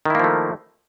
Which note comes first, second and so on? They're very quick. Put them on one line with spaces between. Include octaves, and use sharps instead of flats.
D#3 E4 A#3 F3 A3